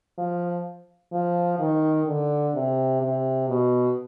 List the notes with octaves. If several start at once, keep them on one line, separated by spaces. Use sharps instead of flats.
F3
F3
D#3
D3
C3
C3
B2